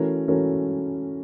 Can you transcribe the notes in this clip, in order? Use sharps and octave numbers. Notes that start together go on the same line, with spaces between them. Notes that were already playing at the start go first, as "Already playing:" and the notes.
Already playing: E3 A3 C#4 F#4 A#4
E3 A3 C#4 F#4 A#4